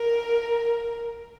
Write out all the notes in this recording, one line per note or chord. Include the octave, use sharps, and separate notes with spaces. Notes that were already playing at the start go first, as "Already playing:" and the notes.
Already playing: A#4